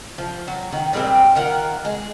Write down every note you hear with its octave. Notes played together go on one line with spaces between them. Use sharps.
F3
F#3
D#3
A#2 G3 G#3 C4
D#3 F4 A#4 F#5
G#3